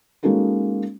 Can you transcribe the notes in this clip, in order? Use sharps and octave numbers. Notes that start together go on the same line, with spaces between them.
G#3 A#3 C#4 D#4 F#4 A4